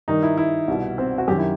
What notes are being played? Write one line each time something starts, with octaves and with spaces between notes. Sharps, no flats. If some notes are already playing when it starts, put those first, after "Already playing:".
G2 D#3 D#4
E4
E4
C2 B2
C4
F#4
F#2 D#3 G4
E4